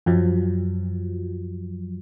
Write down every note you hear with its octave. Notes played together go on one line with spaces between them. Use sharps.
F#2 F3 F#3